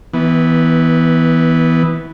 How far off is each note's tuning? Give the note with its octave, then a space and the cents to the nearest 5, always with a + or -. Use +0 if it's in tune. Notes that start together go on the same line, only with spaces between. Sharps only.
E3 -25 B3 +0